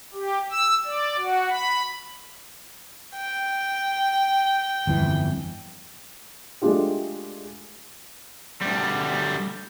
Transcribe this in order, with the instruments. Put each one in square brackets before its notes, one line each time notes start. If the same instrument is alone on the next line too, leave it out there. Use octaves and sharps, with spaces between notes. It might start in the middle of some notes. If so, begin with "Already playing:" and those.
[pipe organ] G4
E6
D5
F#4
B5
[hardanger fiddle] G5
[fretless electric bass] G1 F2 E3
[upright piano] G#3 A3 D4 F4 G4
[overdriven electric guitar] D2 G3